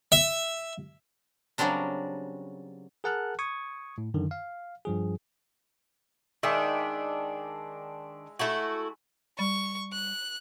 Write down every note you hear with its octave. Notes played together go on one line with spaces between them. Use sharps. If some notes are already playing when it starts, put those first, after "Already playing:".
E5
C#3 F#3 G3 C4 D4 A#4
G#4 A#4 F#5 A5 F6 F#6
C#6 D#6 G#6
A2
F#2 D3 D#3
F5
G2 F3 G#4
D#3 G#3 D4 E5 B5
A3 E4 F#4
G3 C#6
F#6